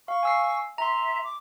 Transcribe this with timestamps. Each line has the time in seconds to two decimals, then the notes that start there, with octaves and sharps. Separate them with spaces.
0.08 F5 C#6
0.23 G#5 E6 C7
0.78 E5 A#5 C6
1.24 D6